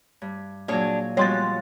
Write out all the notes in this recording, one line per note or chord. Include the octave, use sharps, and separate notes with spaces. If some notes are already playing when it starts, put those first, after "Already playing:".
G2
A#2 F#3 D4 G#4 C#5
F3 G3 G#3 B3 F#4 C#5 C6 A6